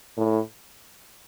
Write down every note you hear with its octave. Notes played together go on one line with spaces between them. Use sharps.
A2